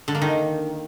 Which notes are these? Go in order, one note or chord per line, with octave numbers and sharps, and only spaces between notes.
D3
A#3
D#3